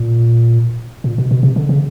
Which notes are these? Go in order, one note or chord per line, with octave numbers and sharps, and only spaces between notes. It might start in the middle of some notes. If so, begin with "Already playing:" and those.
Already playing: A#2
A#2
B2
B2
C3
D3
C#3